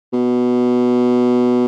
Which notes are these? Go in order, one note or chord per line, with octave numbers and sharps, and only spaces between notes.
B2